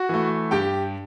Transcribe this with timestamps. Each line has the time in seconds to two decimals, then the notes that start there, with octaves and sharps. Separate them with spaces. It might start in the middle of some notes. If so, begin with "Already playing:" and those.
Already playing: F#4 F#5
0.09 E3 A3
0.51 G2 G4 G5